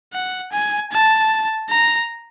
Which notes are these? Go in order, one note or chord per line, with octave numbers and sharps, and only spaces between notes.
F#5
G#5
A5
A#5